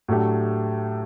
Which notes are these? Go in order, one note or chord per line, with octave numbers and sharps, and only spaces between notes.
A2 F#3 A3 D4 G4